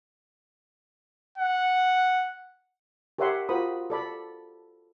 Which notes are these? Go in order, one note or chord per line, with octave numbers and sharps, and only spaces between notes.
F#5
G4 A#4 C#5 E5 F#5 C6
F4 F#4 A#4 C5 B5 D#6
A4 D5 B5